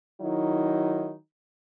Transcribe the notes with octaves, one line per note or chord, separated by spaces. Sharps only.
D#3 F#3 D#4 E4